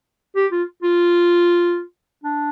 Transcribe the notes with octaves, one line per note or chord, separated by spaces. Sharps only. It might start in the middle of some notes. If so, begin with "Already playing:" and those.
G4
F4
F4
D4